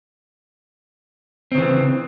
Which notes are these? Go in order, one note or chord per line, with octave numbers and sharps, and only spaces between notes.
C#3 E3 C4